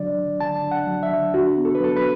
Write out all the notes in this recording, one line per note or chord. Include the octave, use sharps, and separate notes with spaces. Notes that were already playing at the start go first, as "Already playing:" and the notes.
Already playing: D3 F#3 D4 D5
D3
D3 A5
D4
F#5
F#3
E5
D3
D4 F#4
B3
A4
B4
F#3 A4
B4